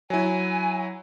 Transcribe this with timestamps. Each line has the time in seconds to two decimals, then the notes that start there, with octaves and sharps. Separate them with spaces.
0.10 F#3 E4 G#5